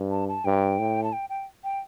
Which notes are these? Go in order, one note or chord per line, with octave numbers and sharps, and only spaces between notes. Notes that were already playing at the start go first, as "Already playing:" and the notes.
Already playing: G2
A5
A5
G2 G5
A2
A5
G5
G5
G5